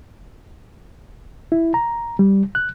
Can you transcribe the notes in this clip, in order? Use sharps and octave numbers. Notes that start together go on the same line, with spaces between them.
E4
A#5
G3
F#6